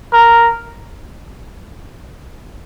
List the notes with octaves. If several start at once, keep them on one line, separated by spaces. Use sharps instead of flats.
A#4